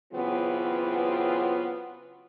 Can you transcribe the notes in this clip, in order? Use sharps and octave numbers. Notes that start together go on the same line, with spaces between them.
C#3 E3 F#3 B3 C4 F4